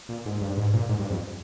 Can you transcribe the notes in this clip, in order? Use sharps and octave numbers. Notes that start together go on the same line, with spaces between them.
A#2
G#2
G2
G#2
A#2
G#2
G2
F2